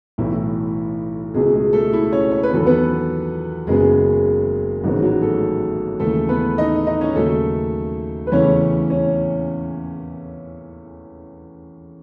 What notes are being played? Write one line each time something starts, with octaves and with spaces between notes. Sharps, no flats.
B1 A2 E3 A3 E4
C#2 B2 G#3 A3 G#4
G#3 G#4
A3 A4
E4
C#4 C#5
C#5
B4
E2 D#3 F#3 B3 A4
B3 B4
F#1 F#2 C#3 F#3 G#3 B3 G#4
A1 G#2 D#3 F#3 G#3 B3 F#4
F#3 F#4
A3 A4
D#2 C#3 E3 A3 A4
B3 B4
D#4 D#5
D#4 D#5
C#4 C#5
D#2 C#3 F#3 A3 A4
B4
E2 C#3 E3 A3 C#4 C#5
C#4 C#5